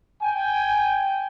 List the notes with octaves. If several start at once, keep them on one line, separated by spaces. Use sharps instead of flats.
G5 G#5